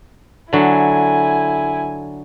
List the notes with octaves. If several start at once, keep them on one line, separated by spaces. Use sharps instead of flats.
D3 F#3 E4 G#5